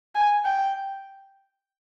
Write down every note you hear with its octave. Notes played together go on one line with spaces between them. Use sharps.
G#5
G5